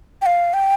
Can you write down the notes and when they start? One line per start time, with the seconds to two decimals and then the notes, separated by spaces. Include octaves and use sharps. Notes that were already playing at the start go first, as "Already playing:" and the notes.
0.22 G5
0.26 F5
0.54 G5